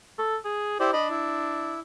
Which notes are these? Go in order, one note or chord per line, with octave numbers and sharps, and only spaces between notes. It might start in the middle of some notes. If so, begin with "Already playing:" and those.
A4
G#4
E4 G4 C5 D5
D4 D#5 B5
E4